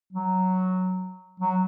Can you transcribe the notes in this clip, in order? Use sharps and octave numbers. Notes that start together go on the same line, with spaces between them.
F#3
F#3